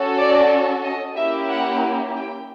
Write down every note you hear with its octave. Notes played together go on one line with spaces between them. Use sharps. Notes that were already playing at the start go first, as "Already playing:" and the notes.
Already playing: C#4 F#4 A4
D5
D#5
A#3 C#4 E4 G4 E5
F#5
G5